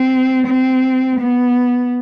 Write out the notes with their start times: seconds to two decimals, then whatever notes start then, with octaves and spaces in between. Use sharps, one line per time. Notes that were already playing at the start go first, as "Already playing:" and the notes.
Already playing: C4
0.47 C4
1.20 B3